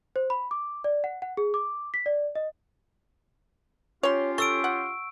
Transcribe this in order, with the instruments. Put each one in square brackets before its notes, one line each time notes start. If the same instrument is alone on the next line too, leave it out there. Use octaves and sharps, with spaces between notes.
[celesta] C5
B5
D6
D5
F#5
F#5
G#4
D6
B6
D5
D#5
[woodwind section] C#4 F4 G4 [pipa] C#5 C6
[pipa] A4 [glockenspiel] C#6 E6 D7
[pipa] F#5